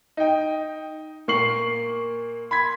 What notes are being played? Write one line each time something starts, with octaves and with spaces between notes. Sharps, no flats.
D#4 G5
A#2 A#3 A#4 C#6 C7 F#7
B5 C6 G#6 B6